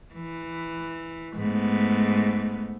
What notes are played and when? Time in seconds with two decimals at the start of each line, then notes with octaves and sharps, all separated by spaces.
0.15 E3
1.36 G#2 A3 B3